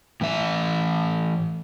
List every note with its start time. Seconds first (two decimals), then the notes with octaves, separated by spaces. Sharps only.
0.21 A2 E3 E5